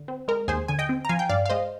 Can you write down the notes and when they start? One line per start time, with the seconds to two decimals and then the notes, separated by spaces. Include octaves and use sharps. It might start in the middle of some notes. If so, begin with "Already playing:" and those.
Already playing: D3
0.08 C4
0.28 G#3 A#4
0.48 D#2 G#4 C5
0.68 D3 G#5
0.79 D#5 G5
0.89 C4
1.05 A#5
1.09 F3 F5 G#5
1.19 G5
1.29 G2 D5 F5
1.46 F5
1.50 G#3 C5 D#5